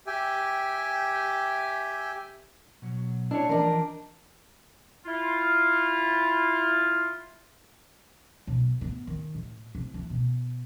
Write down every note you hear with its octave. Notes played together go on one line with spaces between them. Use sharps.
G4 E5 G5 G#5
B2 F#3
D4 E4 G#4 C#5
E3 F3 D4 A#4 D#5
E4 F4
B1
B3
D#3
A2
C2
E3
B2